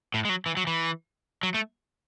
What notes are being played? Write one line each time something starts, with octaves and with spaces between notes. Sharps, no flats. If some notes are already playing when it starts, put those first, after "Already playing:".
A2
G#3
F#3
E3
F#3
E3
F#3
A3